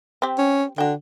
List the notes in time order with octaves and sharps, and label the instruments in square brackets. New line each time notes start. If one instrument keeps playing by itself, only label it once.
[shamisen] C4 G4
[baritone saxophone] C#4
[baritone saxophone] D3 [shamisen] F#4 G5